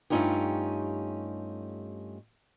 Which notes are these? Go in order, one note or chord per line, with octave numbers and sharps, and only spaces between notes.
G2 A3 C#4 D#4 F4 G4